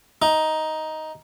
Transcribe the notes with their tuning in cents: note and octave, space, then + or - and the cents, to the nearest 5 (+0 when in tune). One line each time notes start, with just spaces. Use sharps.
D#4 +10